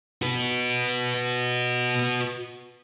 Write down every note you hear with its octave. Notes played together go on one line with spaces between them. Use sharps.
F#4 B4